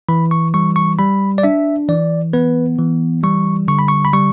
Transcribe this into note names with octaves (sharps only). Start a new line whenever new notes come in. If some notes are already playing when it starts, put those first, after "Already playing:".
E3 B5
C#6
G3 C#6
C#6
G3 B5
D5
D4 E5
E3 D5
B3 B4
E3
G3 C#6
D3 C#6
B5
C#6
B5
G3 C#6